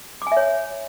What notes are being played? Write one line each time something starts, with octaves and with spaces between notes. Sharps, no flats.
D6
G#5
E5
C#5